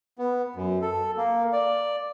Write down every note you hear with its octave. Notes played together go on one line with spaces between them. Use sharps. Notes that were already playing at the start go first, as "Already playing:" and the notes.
B3
F#2
A4
A#3
D5